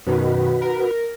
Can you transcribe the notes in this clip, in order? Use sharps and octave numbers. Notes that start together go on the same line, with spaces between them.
F#2 B2 D#3 F#4 B4
A#4